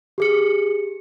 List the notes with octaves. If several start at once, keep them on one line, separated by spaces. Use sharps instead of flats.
G4 G#4 C#7